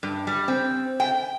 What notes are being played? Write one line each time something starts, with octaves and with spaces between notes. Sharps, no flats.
G2
G3
C4
G5